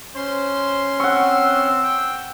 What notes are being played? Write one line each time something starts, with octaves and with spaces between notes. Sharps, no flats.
C#4 C5 C6
C4 F#5 C#6 E6
G5